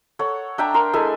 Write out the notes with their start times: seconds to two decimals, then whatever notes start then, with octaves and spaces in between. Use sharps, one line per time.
0.19 A4 C#5 F#5
0.58 D4 E5 G5 A#5
0.74 A#4 A#5 C6
0.93 G#3 E4 A4 G#5